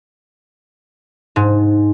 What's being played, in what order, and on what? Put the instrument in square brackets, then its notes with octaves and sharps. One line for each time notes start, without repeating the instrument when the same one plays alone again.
[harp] G#2